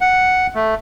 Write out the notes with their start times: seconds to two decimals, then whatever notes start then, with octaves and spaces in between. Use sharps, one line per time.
0.01 F#5
0.55 A3